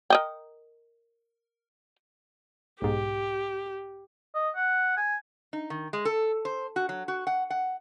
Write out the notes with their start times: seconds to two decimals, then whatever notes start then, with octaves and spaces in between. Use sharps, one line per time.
0.10 A#4 D#5 G5
2.82 B1 G#2 G4
4.35 D#5
4.55 F#5
4.97 G#5
5.53 D#4
5.70 D#3
5.93 G#3
6.05 A4
6.45 C5
6.76 F#4
6.89 F#3
7.08 F#4
7.27 F#5
7.50 F#5